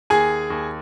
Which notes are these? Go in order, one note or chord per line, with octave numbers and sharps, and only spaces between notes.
D#2 G#4 G#5
D#2